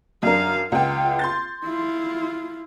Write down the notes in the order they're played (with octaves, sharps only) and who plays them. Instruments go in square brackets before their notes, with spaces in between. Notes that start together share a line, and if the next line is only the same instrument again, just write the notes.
[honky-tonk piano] F#2 D4 A#4 [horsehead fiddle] F5
[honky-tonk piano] C#2 F#5 G5 [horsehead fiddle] F4
[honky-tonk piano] C6 G6 A6
[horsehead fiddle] E4 F4